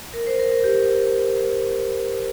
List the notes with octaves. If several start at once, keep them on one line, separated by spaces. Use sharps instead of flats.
A#4
C5
A#4
A#4
G4